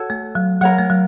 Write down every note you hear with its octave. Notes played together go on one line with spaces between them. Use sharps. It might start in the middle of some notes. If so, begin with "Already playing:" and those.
Already playing: F#4 A4 C#5 A5
A3
F#3
F#3 A#4 C#5 F#5
A3
F#3